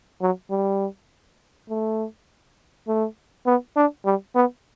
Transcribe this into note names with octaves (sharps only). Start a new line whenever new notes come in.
F#3
G3
A3
A3
B3
D4
G3
B3